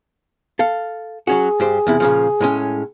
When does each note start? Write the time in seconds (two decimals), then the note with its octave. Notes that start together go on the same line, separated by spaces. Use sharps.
0.59 A4 F5
1.27 F#3 C#4 F#4 G#4
1.60 G2 G4 C5
1.87 E2 C3 E4
2.00 A#2 C#3 F3
2.41 A2 G#3 C#4